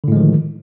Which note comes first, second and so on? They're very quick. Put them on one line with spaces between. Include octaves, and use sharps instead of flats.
D3 A2 G#3 F3 D#3